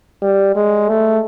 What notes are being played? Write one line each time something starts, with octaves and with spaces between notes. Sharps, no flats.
G3
G#3
A3